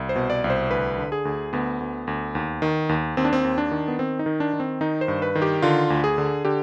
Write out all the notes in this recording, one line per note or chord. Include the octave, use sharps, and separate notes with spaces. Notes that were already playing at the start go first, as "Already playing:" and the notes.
Already playing: C2
C5
B2
D5
C2
C5
D2 B4
D3
G#4
D2
D2 B3
D2
D2
D#2
D#3
D#2
D#2 C4
D4
C4
D#2
D4
D#3
B3
D#3 C4
D#4
D#3
D4
D#3
C4
D#3 D#4
C5
G2
B4
D#3
G4
D3 F4
D2
G#4
D3
D3 G4